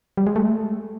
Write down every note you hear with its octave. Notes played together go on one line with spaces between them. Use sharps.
G3
G#3
A3